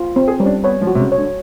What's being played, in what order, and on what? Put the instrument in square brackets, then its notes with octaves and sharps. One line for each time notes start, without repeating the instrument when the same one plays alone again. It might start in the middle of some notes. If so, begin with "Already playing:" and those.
Already playing: [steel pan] F4
C4
[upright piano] G#4
[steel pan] G3 [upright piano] C#4
[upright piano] D4
[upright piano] B3 [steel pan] C#5
[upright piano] F3
[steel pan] F#4
[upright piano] C3
C#3
[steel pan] C#5
[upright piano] D3